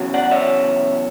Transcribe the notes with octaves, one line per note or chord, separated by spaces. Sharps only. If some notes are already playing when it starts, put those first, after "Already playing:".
Already playing: E2 C#3 F#3
D5 F#5
C#5 E5